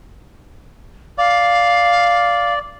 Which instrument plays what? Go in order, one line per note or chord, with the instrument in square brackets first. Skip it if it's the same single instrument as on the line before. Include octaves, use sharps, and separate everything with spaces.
[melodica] D5 [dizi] F5